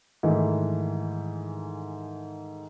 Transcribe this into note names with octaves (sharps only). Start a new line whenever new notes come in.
G#2 D#3 E3 A3